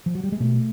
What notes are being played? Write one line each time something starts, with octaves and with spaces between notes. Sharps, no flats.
F3
F#3
G3
G#3
B2 A3